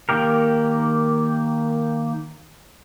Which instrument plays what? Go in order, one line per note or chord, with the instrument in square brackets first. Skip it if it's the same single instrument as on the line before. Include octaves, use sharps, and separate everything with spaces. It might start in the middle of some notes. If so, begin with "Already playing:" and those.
[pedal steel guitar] D#3 A#3 G4 A#4